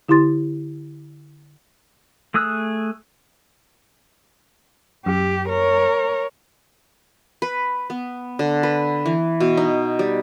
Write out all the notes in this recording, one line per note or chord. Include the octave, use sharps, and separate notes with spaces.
D3 E4 G4 C6 A6
A3 G#4 D#6 E6 F#6
F#2 G4
A#4 C#5
B4
B3
D3
B4
E3
B2
D#4
G3